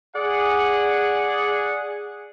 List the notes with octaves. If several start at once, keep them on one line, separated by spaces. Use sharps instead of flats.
G#4 D5 F#5